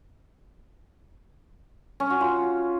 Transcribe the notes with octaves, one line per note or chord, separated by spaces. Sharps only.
C#4
F#4
F4